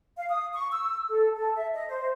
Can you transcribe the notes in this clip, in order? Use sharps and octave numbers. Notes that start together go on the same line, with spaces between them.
F5
D#6
C#6
E6
A4
A4
E5
D#5
C5